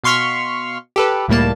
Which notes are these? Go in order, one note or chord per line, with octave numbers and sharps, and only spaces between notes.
B2 F5 C6 C#6 F6 B6
G4 A4 B4
C#2 A2 G3 A#3 A5